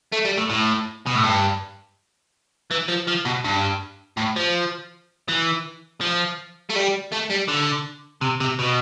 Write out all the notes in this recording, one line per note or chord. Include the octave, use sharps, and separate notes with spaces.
A3
G3
A2
A2
B2
A2
G2
E3
F3
F3
B2
G2
A2
F3
E3
F3
A3
G3
A3
G3
D3
C3
C3
B2